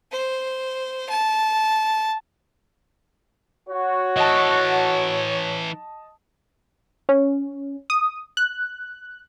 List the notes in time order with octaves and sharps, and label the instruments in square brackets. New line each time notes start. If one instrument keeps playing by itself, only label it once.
[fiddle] C5
A5
[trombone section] F#4 [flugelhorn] C#5
[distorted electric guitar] E3 A4 [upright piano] D#5 A5
[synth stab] C#4
D#6
F#6